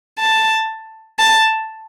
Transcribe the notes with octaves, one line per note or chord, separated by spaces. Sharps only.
A5
A5